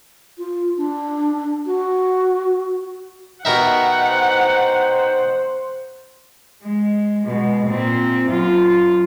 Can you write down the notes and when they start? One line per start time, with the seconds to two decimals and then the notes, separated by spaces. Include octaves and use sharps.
0.38 F4
0.77 D4
1.66 F#4
3.45 B2 D#4 A#4 E5 F#5 G5
4.11 C5
6.64 G#3
7.26 B2 G#3
7.68 A#2 C4
8.30 F#2 F4